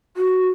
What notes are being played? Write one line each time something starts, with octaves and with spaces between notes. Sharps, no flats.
F#4